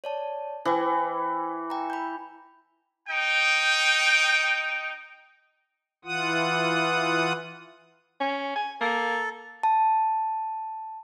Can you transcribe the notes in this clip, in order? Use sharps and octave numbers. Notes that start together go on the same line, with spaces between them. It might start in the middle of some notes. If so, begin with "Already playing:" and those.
C#5 D5 A5
E3 C5 G5
G5 A#5
B5 G6
D#4 G5
E3 F4 F#5 D#6
C#4
G#5
A#3 A4
A5